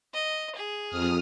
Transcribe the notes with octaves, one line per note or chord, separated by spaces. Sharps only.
D#5
G#4
F2 D#6 F6